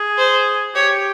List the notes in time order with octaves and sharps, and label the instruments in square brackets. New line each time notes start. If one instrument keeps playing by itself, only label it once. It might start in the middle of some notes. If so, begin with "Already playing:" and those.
Already playing: [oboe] G#4
[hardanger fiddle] C5
[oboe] G4 [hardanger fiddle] C#5